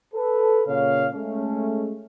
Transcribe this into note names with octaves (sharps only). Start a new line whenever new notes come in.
A4 B4
A#2 C#3 C#5 F5
G#3 A3 C#4